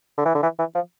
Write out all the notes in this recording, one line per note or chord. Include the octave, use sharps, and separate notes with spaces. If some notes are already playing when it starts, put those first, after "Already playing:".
D3
E3
D3
E3
E3
F3